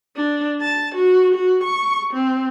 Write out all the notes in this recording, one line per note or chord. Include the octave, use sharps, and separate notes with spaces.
D4
A5
F#4
F#4
C#6
C4